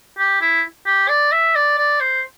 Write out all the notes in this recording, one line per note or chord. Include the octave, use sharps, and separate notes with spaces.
G4
E4
G4
D5
E5
D5
D5
C5